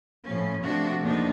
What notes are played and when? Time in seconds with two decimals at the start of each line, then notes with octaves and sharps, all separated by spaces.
0.23 A2 F3 C#4
0.63 C3 F3 A3 D4 F#4
1.00 E2 A#2 F3 D4 D#4